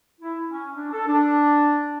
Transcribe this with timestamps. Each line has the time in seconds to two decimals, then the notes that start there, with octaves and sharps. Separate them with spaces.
0.21 E4
0.50 C#4
0.75 D4
0.93 A4
1.07 D4